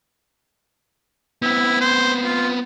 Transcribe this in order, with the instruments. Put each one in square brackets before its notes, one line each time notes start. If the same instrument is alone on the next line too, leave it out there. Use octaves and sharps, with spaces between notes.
[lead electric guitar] B3 C4 [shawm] E4
[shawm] C5
F4